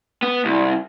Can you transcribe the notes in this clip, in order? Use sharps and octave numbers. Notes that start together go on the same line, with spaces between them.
B3
C2